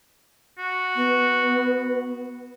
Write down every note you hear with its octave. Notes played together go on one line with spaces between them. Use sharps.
F#4
B3